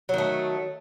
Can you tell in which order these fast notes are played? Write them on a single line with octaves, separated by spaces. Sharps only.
F#3 D#3 A3